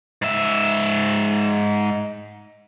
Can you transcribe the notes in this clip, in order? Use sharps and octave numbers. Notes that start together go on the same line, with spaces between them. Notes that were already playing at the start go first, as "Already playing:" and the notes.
G#2 E5